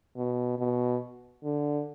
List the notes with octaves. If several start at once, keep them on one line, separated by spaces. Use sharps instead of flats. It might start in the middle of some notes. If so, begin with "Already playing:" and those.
B2
B2
D3